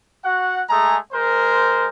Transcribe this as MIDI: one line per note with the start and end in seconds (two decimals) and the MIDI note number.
0.24 0.63 66
0.24 0.63 78
0.70 0.97 56
0.70 0.97 57
0.70 0.97 68
0.70 0.97 82
1.13 1.87 56
1.13 1.87 70
1.13 1.87 72